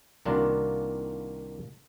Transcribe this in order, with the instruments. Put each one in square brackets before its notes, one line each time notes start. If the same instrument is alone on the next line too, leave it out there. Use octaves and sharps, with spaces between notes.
[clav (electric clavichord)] C2 D#3 A#3 D4 F4 F#4